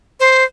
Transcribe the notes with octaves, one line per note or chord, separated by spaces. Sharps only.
C5